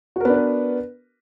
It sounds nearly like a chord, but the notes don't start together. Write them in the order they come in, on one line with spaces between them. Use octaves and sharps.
F#4 A#4 B3 D4 B4